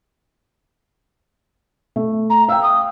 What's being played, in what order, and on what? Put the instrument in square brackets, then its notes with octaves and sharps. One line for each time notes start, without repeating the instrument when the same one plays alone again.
[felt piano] A3
[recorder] A#5
[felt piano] F5 G5 [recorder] E6
[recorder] D#6